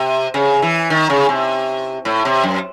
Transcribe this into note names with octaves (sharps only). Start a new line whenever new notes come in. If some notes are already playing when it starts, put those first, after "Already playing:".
Already playing: C3
C#3
E3
D#3
C#3
C3
A2
C3
F#2